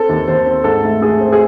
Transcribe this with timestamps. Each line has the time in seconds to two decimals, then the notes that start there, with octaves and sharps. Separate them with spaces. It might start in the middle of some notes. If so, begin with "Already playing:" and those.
Already playing: C4 A4
0.09 D#2
0.28 D#2 C5
0.46 C4
0.64 G#2 A4
0.83 A3
1.02 A3 G#4
1.20 C4
1.33 G#4